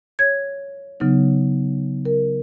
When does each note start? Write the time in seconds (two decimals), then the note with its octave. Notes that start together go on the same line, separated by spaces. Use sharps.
0.19 C#5 G#6
1.00 C#3 F#3 B3 D#4
2.05 A#4